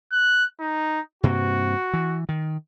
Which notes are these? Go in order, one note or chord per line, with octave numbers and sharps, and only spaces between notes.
F#6
D#4
G2 C3 A#3 F#4
E3
D#3